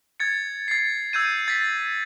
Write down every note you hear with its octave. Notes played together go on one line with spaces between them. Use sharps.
G#6 A6 C#7
A6 C7
E6 G6 G#6 D#7
A6 B6